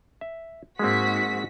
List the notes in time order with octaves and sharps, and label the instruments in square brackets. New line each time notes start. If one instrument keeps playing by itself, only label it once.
[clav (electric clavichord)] E5
[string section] G#2 F#4 B6 [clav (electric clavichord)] G#3 A#3 C4